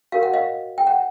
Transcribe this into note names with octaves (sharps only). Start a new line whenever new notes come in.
F#4 A#4 C#5 F5
F#5
D#5 F5
G5
F#5